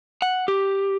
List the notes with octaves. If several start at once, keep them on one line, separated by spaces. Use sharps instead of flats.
F#5
G4